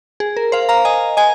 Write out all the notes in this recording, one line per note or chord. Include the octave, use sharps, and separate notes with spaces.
G#4
A#4
C5 F5
F5 A#5
D#5 G#5
D#5 G#5